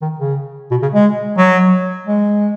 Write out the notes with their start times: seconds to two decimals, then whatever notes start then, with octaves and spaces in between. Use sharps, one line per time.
0.02 D#3
0.19 C#3
0.71 B2
0.82 C#3
0.93 G#3
1.38 F#3
2.06 G#3